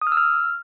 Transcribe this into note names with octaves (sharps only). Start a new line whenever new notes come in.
D#6
F6
E6
F6